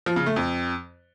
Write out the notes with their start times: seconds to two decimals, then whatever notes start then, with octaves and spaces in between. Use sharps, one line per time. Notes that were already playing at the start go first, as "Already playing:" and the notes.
0.06 F3
0.16 C#3
0.26 A3
0.36 F2